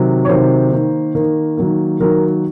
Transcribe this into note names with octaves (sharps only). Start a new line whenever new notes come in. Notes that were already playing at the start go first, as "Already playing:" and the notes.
Already playing: C3 D#3 F#3
C#5
C3 D#3 F#3 C5
D#3 A#3
D#3 A#3
D#3 F#3 A#3
D#3 F#3 A#3 A#4